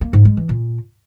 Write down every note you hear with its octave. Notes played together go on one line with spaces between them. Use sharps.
A#3
G#2
G#3
E3
A#2